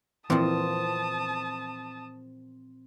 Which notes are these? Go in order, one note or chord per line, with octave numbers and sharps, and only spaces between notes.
A#2 E3 F3 C4 A5 D#6